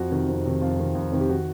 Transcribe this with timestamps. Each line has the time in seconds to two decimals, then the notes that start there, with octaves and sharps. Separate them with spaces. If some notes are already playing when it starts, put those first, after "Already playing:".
Already playing: F2 F#4
0.10 C3 D#3
0.28 F2
0.45 C3 D#3
0.62 F2 F4
0.78 C3 D#3
0.95 F2
1.12 C3 D#3
1.20 G4
1.30 D#3 F#4